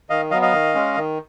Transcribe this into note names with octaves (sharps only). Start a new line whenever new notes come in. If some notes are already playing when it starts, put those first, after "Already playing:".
D#3 D#5 F5
F#3 B3 D#5 F5
D#5 F5
D#3
G#3 C#4
D#3